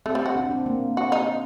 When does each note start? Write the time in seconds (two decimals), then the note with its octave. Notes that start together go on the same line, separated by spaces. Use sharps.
0.06 A3 C4
0.15 G3
0.26 F#4
0.36 D4
0.51 C4
0.66 A#3
0.97 F#4
1.12 D#4